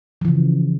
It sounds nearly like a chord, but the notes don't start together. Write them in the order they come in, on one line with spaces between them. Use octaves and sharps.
F3 E3 C#3